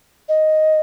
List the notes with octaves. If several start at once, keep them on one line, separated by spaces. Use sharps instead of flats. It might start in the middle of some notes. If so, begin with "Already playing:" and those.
D#5